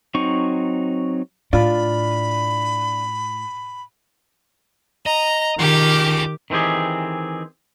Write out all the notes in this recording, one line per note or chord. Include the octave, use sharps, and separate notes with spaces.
F#3 C4 D#4 C#6
A2 D4 F4 B5
D#5 A#5
D#3 F4 G4 G#4 D6
D#3 E3 C4 G4 G#4